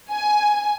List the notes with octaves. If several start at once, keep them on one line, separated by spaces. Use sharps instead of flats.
G#5